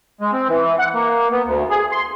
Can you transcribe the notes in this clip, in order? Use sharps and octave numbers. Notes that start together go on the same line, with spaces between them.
G#3
C4
E3
F#5
A#3
B3
D2
G#4
C6